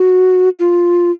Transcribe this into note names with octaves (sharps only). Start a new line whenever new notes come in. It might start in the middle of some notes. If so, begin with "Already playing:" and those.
Already playing: F#4
F4